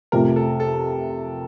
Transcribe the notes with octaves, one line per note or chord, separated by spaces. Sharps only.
F2 C3 F3 A3 A#4
A4
A4